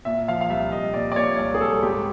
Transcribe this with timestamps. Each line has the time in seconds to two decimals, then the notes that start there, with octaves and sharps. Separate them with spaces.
0.05 A#2 E5
0.28 F3 F5
0.41 F5
0.49 C2 E5
0.71 C2 D#5
0.94 A#2 D5
1.12 D5
1.16 A#2 C#5
1.38 C2 D5
1.54 G#4
1.61 C2 A4
1.83 G#2 G4